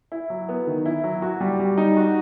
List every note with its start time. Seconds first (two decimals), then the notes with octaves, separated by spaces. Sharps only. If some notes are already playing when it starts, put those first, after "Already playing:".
0.12 E4
0.30 F#3
0.49 B3
0.67 D#3
0.86 E4
1.04 F#3
1.22 F#4
1.41 G3
1.60 G3
1.78 D#4
1.97 F#4